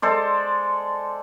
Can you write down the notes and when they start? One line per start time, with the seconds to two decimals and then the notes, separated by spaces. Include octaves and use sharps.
0.02 G#3 A4 C5 D5